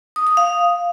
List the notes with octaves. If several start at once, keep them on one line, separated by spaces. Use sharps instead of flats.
D#6
D#6
F5